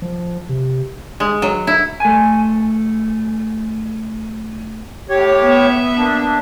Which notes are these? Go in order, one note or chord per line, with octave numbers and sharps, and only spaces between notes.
F3
C3
G#3
F#3
E4
A3 G#5
A2 G4 C#5
B3 E5
A#3 D4